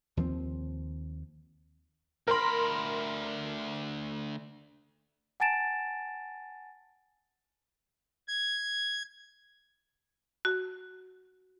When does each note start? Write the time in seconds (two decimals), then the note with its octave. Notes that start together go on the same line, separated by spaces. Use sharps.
0.17 D#2 F3 G3 C4
2.28 D2 A#4 B5 C6
5.40 F#5 G#5 A5 A6 D7 E7
8.28 G#6
10.45 F#4